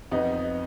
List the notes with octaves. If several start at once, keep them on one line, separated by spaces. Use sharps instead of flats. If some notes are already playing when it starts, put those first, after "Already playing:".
F2 B3 D#4